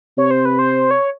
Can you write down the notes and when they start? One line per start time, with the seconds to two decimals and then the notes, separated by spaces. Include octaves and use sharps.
0.18 C3 C#5
0.31 C5
0.45 B4
0.59 C5
0.91 C#5